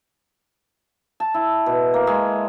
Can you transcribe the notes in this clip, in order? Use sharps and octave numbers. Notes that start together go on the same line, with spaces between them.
A5
E4
B2
A#3
G#3